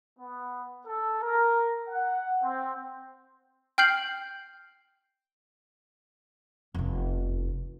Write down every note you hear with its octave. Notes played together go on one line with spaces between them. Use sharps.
B3
A4
A#4
F#5
C4
G5 F6 G6 C7 F#7
F1 E2